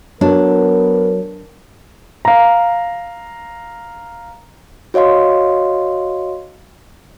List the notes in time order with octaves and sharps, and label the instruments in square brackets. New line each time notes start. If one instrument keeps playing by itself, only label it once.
[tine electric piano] F#3 [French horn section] B3 A#4 [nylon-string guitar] D4
[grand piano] F5 A#5
[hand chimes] F#4 C#5 D#5 F5 C6